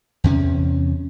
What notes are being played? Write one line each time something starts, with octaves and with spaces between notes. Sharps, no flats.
E2 C3 C#4